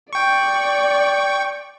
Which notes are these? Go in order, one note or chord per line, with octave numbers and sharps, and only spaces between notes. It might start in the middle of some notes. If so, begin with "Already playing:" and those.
D5 G5 C#6